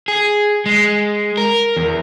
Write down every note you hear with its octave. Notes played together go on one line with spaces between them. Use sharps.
G#4
G#3
A#4
E2